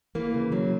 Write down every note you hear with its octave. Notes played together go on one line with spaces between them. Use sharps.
E3 A#3
C#3
F#3